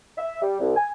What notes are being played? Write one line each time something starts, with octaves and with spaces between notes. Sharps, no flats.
E5
G3
C2
G#5